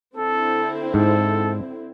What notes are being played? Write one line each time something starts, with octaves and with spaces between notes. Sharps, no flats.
D3 C4 E4 A4
G#2 A4